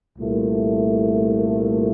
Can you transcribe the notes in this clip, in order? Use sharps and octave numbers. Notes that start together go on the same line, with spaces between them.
C2 A#2 A3